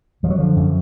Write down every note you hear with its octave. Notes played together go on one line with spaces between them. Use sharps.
F#2 F3
F#3
D3 F3
F#2